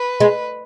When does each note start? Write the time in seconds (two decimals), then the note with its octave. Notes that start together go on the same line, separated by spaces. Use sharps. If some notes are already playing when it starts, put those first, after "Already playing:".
Already playing: B4
0.20 G#3